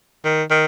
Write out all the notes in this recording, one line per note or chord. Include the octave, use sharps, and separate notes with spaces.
D#3
D#3